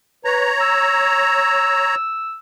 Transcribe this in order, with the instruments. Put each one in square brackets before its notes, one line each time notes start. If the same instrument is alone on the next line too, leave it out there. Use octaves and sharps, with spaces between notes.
[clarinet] B4 [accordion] C#5 A#5
[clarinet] E6